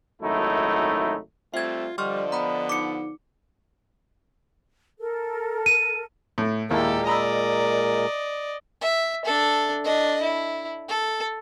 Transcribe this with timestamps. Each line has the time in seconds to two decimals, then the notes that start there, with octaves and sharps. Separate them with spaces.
0.22 G#1 F#2 A3 D#4 E4
1.54 G3 A3 C4 F4 E5 G#6
1.98 D3 F3 G3 D5 D#5 C6 C#6 F6
2.32 B3 A#5 B5
2.69 D#4 D6 C#7
5.00 A4 A#4
5.66 D#7
6.38 A2 A3
6.71 D#2 A#2 G#3 E4 G4 A4 A#4
7.07 D5 D#5 A#5 B5 E6
8.81 E5
9.25 D4 A4
9.84 D4 D#5
10.22 E4
10.89 A4